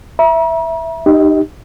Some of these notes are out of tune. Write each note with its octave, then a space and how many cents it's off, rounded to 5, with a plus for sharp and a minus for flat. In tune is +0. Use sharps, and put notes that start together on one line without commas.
E5 +0 A#5 +40
D#4 -25 G4 +0 D#5 +25